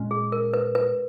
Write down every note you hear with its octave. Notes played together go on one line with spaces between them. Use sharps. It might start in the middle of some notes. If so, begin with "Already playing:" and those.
Already playing: A#2 G#3 C#4
G#4
A#4
B4
B4